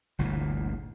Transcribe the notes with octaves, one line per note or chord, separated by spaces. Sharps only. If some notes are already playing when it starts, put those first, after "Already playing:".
G1 D2 A#2 E3